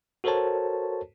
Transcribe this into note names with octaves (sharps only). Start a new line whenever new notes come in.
F#4 A4 A#4 C5 C#5 A5